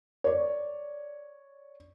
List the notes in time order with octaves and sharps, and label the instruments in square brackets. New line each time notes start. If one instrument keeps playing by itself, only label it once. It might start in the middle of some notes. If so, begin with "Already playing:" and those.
[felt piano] C#5 D5